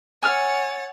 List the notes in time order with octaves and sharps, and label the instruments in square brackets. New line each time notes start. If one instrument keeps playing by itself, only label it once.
[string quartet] C#5 F#5 A6 [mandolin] G#5 E6 F6